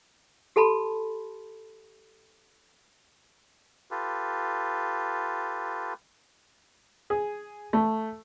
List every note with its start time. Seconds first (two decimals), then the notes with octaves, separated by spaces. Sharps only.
0.56 G4 A4 A5 B5 C6
3.91 F4 G4 A4 B4
7.10 G#4
7.73 A3